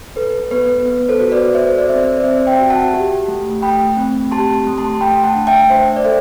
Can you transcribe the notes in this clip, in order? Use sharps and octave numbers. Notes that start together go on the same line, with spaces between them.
A4 B4
B3 B4
B3 B4
A4 C5
F#4
B4 D5
A4 C5 E5
C5
D5
C4 C5 E5
D5
C4 C5 E5
E5 G5
F#4
F#5 A5
G4
A3
A3 G5 B5
C4
G4 A5 C6
A3
A5 C6
A3 G5 B5
F#5 A5
D4
E5 G5
D4 C5 E5
D5
A4 C5 E5